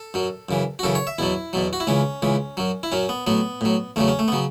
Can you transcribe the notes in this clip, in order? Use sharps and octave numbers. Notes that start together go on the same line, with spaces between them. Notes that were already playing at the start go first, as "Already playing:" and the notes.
Already playing: A4
F#2 F#3
F#2 C#3 E3
F#4
F#2 C#3 E3 A4
C#5
E5
E2 B2 F#3 E4
E2 B2 F#3
F#4
E4
C#2 C#3 E3 C#4
C#2 C#3 E3
F#2 F#3
E4
F#2 F#3 C#4
B3
A2 F#3 B3
A2 F#3
E2 C#3 F#3 A3
C#4
A3
B3
C#3 F#3